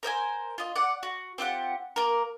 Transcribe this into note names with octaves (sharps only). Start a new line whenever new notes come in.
A#4 C5 E5 G#5
F4 D#5
D5 F#5
F#4
C4 F4 G4 F#5
A#3 A#4